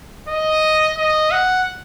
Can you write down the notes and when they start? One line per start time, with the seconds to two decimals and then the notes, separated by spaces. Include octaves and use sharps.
0.28 D#5
0.97 D#5
1.32 F#5